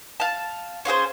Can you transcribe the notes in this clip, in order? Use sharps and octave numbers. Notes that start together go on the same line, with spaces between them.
F5 A5
C#4 F4 G#4 C5